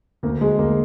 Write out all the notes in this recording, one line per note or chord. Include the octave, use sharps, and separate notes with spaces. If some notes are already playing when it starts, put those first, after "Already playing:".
D2 A#3
D2 G#3
D2 A#3